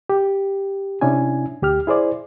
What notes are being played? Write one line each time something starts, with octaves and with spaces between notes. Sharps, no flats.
G4
C3 C#4 D4 E4 G#5
D2 G4 F6
E4 G#4 C5 D5